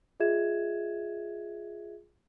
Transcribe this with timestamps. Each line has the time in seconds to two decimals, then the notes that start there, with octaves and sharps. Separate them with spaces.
0.20 F4 G#4 D#5 E5 G#6 E7